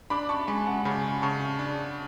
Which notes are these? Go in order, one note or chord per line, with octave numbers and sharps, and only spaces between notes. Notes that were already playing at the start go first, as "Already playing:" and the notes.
D4 B5 D6
A5 C#6
G#3 G#5 B5
F#5 A5
C#3 G#5 B5
C#3 A5 C#6
D4